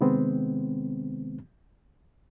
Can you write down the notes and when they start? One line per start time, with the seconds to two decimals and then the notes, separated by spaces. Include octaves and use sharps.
0.01 C3 D#3 G#3 B3 C4